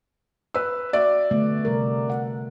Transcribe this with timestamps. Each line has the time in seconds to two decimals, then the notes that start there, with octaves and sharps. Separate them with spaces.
0.54 B4 E6
0.93 F#4 D5 E5
1.31 D3 A3 B3
1.65 C3 G3 A#4
2.10 F#5